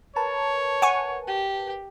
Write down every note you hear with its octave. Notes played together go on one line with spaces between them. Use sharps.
A#4 B4 C#5 A5
F#5 G#5 C#6
G4